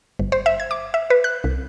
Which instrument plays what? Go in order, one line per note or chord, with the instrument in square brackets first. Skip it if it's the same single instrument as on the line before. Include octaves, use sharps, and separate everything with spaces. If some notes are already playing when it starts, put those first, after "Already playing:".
[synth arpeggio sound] G1
C5
E5
G#6
D6
E5
B4
F#6
C2